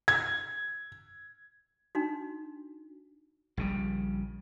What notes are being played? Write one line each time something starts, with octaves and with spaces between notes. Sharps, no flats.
G#6
D4 D#4 F#4
A#1 C#3 G3